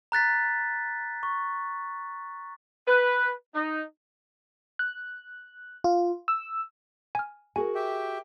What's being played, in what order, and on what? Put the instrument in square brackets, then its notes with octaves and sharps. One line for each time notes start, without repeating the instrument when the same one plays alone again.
[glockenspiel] A#5 F#6 A6 B6
C#6
[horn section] B4
D#4
[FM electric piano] F#6
F4
E6
[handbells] G#5 F6
[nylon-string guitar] F#4 G#4 A#4 [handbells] G#5
[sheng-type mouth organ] G4 E5 G5